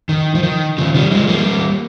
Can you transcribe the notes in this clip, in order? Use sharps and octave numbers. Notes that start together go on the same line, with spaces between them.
D#3
F3
D#3
C#3 F3
D#3 G3
F3 G#3
G3 A#3